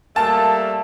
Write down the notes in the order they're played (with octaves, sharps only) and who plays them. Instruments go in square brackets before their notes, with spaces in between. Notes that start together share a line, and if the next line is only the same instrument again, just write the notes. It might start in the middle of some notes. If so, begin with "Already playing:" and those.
[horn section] G3 A3 A#3 [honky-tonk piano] A5